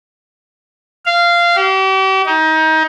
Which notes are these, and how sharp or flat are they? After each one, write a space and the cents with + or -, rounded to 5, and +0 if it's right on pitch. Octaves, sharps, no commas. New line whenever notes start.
F5 -15
G4 -40
D#4 +25